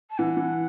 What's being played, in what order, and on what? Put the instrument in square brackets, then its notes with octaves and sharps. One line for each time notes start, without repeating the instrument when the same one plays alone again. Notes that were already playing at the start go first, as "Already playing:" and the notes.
[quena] A5
[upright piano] E3 [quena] F#5
[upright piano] E3